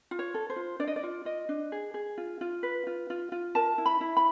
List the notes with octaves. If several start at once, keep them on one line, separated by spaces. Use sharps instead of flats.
F4
C#5
A4
C5
F4
D4 D5
D#5
D5
F4
F4 D#5
D4
G#4
G#4
F4
F4
B4
F4
F4
F4
A#4 A5
E4
B5
E4
B5